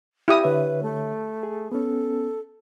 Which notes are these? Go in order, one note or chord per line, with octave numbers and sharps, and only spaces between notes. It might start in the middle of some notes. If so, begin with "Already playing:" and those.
E4 G4 D#6
D3 B4 C#5 E5
A3
G#4
B3 C#4 A4